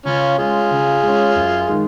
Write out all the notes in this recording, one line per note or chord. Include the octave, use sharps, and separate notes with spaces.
C#3 C#4 F4
G#3 C#4 F4 G#4
C#3
G#3 C#4
F#2
D#3 G#3